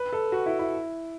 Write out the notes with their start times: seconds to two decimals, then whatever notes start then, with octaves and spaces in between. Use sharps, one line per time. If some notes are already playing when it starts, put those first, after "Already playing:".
Already playing: B4
0.13 A4
0.32 F#4
0.46 E4
0.59 E4